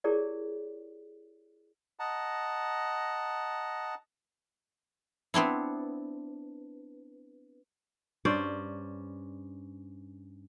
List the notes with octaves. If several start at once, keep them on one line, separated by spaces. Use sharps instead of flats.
E4 G4 G#4 A#4 C#5 D5
D#5 F#5 A5 A#5
B3 C4 D4 E4
G2 C#4 C5 D5